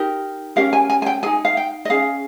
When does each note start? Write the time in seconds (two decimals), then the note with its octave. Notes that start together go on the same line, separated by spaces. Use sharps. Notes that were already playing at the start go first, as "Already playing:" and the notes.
Already playing: D#4 G4 A#4
0.56 C#4 G4 A#4 F5
0.73 G#5
0.90 G#5
1.02 G#5
1.06 G5
1.23 G#4 G#5
1.26 D#4
1.45 F5
1.57 G5
1.85 D#5
1.90 C#4 G#4 F5